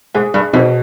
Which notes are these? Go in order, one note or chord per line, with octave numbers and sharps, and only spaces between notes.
G#2 G#4
G2
F2 B2